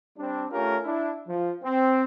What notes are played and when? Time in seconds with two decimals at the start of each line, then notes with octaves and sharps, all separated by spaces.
0.18 G3 C4 D4
0.52 A3 C#4 F4 G4 A#4
0.84 D4 E4
1.28 F3
1.63 C4